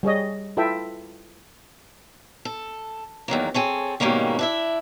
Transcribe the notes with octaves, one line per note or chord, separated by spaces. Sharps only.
G3 G#4 C#5 D#5
E4 F4 A4 B4 E5 G5
A4
E2 D#3 F#3 A#3
C4 G#4 A4 C#5
G#2 B2 D#3 G3 A#3 C#4
D4 E4 E5